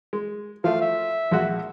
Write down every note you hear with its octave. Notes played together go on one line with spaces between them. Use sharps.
G#3
F3 A3 F5
E5
A#1 G#3 F#4